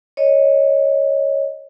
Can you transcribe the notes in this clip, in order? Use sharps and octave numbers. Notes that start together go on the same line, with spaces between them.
C#5 D#5